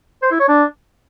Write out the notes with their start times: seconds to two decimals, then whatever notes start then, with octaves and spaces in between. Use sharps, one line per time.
0.22 C5
0.31 E4
0.40 C#5
0.48 D4